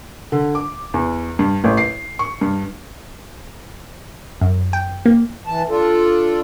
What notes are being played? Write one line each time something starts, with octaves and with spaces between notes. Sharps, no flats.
D3
D6
E2
G2
A1
C7
C#6
G2
F#2
G5
A#3
E3 A5
D4 F4 A4